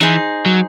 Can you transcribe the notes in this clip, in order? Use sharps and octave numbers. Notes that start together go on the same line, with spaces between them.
E3 D#4 G#4 C5
F#3